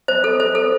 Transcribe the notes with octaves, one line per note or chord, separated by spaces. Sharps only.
C5
A4
C5
A4